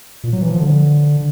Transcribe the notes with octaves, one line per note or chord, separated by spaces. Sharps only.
A#2
F#3
E3
F3
D3